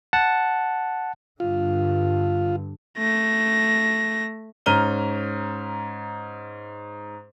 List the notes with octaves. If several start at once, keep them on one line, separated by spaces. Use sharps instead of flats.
F#5 A5
G2 D3 F4
A3 A#6
G#2 C#4 A#5 F6 D#7 G7